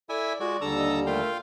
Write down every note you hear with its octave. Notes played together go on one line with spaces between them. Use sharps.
E4 A4 D5 E5 G#5
G#3 F4 F#4 D5
D#2 D3 G3 D4 A4 A#5 E6
D#5
A3 F4 A#4 F5 G5